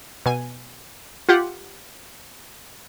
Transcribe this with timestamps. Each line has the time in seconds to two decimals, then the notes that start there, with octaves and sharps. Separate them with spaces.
0.26 B2 G#5
1.29 F4 G4 F#5